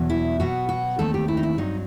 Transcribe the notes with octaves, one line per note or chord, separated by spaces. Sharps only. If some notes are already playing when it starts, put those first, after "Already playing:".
Already playing: E2 B2 F#3
E4
B2 F#3 B3 F#4
F#4
D#2 D#3 A3 C4 A4
G4
E4
D#4
E4
G2 F#3 C4 D#4